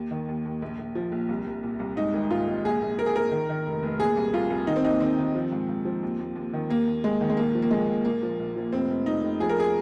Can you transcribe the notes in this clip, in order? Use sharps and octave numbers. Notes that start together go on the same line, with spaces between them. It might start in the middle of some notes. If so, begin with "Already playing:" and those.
Already playing: D#2
D#3
D#2
D#2
A#1
A#1
F3
A#1
C2
C2
A#2
C2
G#2 D#4
G#1
G#1 F4
G#1
A#1 G#4
A#1
A#1 A#4
G#4
A#1 A#4
D#3
D#3
F1
F1
A#2 G#4
C2
C2 F4
C2
D#3 D#4
C4
D#2 D#4
D#3 C4
D#3
F3
G#2
G#2
F3
D#2
D#2
D#2
D#3
D#2 A#3
D#2
D#2 G#3
D#3
G#3
A#1 A#3
F3
A#3
A#1 G#3
A#1
A#2 A#3
F3
A#1
F3
F1 C4
F1
F1 D#4
F1
F3 G#4
A#4
G#4